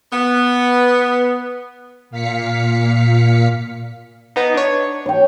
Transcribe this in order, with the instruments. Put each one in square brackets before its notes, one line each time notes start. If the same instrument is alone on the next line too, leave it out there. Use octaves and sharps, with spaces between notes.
[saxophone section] B3
[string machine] A#2 F5 B6 C#7
[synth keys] B3 D#4
D4 C#5
[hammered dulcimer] C#5 G5